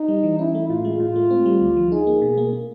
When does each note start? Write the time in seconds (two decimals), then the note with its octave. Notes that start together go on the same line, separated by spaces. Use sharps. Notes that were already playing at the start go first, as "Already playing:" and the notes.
Already playing: D#4
0.08 G3
0.23 E3
0.39 C#4 E4
0.55 A3
0.69 A2 F4
0.85 G#3
1.00 A2 F4
1.16 A3
1.31 C4
1.46 G3
1.61 D2
1.77 F3
1.91 D#4 G#4
2.07 A#3
2.22 B2
2.37 A#3
2.53 A#3